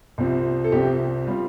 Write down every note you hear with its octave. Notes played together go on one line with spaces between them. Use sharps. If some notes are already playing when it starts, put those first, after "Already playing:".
C2 C3 F3 C4
A4
C2 C3 F3 C4 G4
G3 C4 F4